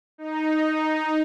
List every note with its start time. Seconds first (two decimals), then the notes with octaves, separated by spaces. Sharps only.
0.18 D#4